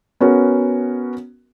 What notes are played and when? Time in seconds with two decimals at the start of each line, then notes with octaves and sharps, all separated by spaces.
0.20 B3 C#4 F#4 A#4